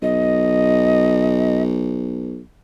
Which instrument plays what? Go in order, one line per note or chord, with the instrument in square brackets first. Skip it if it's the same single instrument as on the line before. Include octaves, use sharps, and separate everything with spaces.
[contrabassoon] B1 [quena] D#5